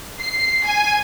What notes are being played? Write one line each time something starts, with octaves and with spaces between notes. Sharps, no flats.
C7
G#5